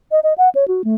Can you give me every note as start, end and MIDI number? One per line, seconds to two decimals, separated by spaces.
0.12 0.20 75
0.23 0.33 75
0.38 0.49 78
0.55 0.67 73
0.68 0.82 66
0.84 0.95 57